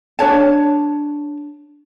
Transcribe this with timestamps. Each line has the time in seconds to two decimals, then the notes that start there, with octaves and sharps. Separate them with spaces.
0.19 D4 B4 C#5 A5